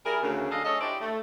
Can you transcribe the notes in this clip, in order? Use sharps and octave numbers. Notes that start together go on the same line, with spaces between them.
G3 E4 G#4 A#4
D2 C#3
F#3 C#4 D4 A4 D#5 F5
A3 G#4 A4 C#5 D#5
D4 E4 G4 C5 D5
A3